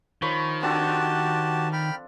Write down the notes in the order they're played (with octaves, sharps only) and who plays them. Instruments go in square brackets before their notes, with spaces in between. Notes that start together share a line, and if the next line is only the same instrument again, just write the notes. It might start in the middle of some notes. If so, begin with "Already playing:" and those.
[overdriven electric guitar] D#3 [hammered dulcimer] F3 C#5 B5
[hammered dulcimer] C4 D4 A4 [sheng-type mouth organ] F#4 G4 A5
[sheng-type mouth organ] G5 B5 F6